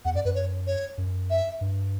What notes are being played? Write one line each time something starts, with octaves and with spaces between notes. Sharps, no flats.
E2 F#5
F#2 D5
F#2 B4
C#5
C#5
F#2
E5
G2